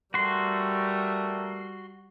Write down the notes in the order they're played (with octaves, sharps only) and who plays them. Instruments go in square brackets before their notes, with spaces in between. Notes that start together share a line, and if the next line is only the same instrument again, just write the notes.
[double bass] G3 [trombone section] A3 G4 A#4 [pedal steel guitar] F#4 C6